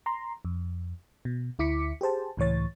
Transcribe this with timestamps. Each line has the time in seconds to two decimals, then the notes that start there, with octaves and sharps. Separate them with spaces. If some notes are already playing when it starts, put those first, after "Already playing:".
0.06 A#5 C6
0.45 F2
1.25 B2
1.59 D2 E4 D6 B6 C#7
2.01 G4 G#4 C5 A5
2.37 C#2 A2 E3 C#5 A6